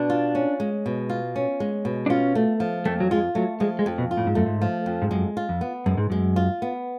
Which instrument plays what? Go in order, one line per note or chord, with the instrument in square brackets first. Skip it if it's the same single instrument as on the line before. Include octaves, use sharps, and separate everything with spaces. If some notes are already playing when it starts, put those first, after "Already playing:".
Already playing: [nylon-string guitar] B2 [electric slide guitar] D4
[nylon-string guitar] F4
C#4
G#3
B2
F4
C#4
G#3
B2
[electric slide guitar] D4
[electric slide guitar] C#4 [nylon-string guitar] F4
[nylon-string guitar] A3
F3
[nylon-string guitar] F2 [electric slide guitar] A3
[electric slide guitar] F#3
[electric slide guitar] G#3 [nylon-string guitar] F4
[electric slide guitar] F#3 [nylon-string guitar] A3
[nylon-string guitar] F3 [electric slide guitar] G#3
[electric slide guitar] G#3
[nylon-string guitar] F2
[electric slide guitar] B2
[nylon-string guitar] F4
[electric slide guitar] A2
G#2
[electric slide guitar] F#2 [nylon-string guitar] A3
[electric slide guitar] G#2
[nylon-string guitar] F3
F2
[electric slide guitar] G#2
[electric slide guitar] F#2 [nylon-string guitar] G#3
[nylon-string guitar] F4
[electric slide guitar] F2
[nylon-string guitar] B3
[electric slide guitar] F#2 [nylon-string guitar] G#3
[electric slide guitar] G#2
[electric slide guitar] F#2 [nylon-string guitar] G#3
[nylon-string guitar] F4
B3